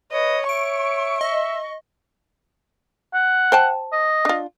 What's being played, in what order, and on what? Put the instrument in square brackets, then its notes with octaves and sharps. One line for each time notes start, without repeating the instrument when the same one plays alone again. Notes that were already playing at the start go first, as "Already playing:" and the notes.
[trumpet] B4 [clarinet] C#5 [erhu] D#5
[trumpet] E5 [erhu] C#6 [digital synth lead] D7
[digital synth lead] D#5 [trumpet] E5
[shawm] F#5
[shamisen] C5 G5 A5
[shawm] D#5
[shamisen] D4 F4